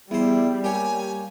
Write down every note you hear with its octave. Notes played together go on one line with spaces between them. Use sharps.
E2 G3 E4 C5
A#3 G4 C#5 G#5